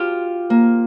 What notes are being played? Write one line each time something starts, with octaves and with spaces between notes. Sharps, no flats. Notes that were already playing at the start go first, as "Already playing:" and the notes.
Already playing: F4 G4
A#3